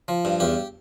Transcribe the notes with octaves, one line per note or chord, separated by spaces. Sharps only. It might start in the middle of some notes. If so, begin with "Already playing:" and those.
F3
G2
E2 G4